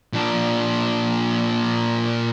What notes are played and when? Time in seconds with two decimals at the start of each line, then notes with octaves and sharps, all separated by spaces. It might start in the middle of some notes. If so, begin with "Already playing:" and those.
0.13 A#2 D4